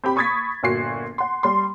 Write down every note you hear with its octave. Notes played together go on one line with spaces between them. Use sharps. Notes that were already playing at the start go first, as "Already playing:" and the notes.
C4 G4 B5
B5 C#6 D#6 G#6 A6 B6
G1 A#2 F#4 C7
F#5 C6
G3 C6